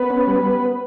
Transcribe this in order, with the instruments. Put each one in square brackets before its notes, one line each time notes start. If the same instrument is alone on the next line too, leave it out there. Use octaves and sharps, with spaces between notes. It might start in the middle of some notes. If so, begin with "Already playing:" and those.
Already playing: [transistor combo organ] B3 B4
C#4
G3